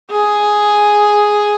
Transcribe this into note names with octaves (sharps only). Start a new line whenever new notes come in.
G#4